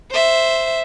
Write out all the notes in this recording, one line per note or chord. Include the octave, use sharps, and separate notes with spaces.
C5 E5